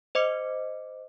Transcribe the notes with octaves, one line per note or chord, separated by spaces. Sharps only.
C5 D#5 D6 C#7